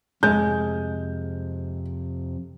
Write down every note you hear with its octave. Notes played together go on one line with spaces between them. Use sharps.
F2 C3 G#3 G6